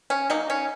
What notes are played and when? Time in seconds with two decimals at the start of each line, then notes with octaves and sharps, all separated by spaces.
0.10 C#4
0.30 F#3 A#3 D#4
0.50 C#4